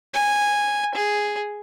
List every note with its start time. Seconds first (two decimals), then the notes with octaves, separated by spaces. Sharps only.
0.14 G#5
0.95 G#4